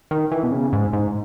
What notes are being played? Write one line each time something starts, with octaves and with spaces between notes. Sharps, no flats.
D#3
E3
B2
C#3
G#2
G#2